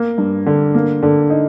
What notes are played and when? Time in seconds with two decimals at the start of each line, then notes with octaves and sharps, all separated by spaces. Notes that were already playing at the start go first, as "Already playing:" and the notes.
Already playing: A#3
0.18 G2
0.46 D3
0.75 A#3
1.03 D3
1.30 D#4